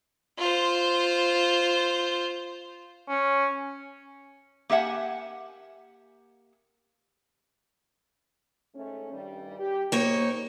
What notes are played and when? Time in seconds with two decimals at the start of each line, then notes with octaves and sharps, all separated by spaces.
0.39 F4 C5
3.09 C#4
4.70 A#3 G4 E5 F#5 G#5
8.75 G#2 A3 C#4
9.12 G2 D#3 G3
9.59 G4
9.92 G#2 G3 A#3 D#4 C5 C#5